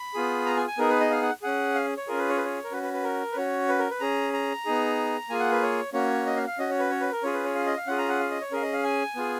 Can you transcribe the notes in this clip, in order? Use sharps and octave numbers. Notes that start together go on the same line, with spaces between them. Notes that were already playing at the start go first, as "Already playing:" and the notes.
Already playing: B5
B3 F4 G#4
A#5
G#5
G#5
B3 D#4 G#4 A#4
B4
D#5
F5
F#5
C#4 G#4 F#5
F5
C#5
C#4 F4 G#4 A#4
B4
C#5
B4
C#5
A#4
C#4 F#4 B4
B4
B4
A#4
B4
C#4 F#4 C#5
B4
A#4
B4
C#4 G#4 A#5
A#5
B3 D#4 G#4
A#3 F4 G#4 G#5
F#5
B4
C#5
A#3 C#4 F#4 C#5
D#5
F5
F5
C#4 F#4 D#5
C#5
B4
C#5
B4
A#4
C#4 F4 G#4 C#5
B4
C#5
F5
D#5
F5
C#4 F4 G#4 F#5
A#5
F#5
F5
D#5
C#5
C#4 G#4 A#4 F5
D#5
F5
G#5
B3 F4 G#4